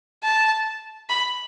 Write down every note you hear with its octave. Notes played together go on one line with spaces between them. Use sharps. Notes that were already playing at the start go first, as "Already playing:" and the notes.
A5
B5